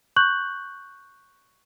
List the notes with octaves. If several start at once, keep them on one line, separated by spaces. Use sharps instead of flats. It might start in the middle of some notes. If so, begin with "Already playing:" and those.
C#6 F#6 G6 F#7